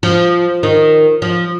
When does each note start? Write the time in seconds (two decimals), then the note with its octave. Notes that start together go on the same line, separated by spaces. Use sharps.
0.03 F3
0.63 D#3
1.22 F3